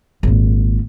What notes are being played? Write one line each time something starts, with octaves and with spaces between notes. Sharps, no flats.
G#1 A#2